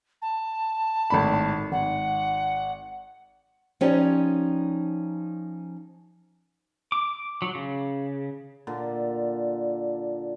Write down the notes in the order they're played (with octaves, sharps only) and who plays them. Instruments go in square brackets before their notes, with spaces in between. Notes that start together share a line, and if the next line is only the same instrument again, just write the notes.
[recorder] A5
[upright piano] G#1 A2 B5
[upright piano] G#1 [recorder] F#5
[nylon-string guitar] F3 C#4 D#4 G4 C#5 D5
[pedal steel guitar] D6
F#3
C#3
[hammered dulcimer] A#2 D3